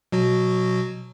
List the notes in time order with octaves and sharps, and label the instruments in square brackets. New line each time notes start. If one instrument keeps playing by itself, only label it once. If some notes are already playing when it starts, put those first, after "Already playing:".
[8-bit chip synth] B2 F#3 F#4